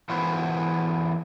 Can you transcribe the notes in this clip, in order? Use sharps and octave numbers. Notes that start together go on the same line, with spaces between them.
E3 B3 F4 F#4 B4 C5